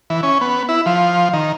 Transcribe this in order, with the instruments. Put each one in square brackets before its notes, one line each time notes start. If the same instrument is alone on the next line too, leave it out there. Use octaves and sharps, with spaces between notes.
[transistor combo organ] E3
C#4
B3
E4
F3
D#3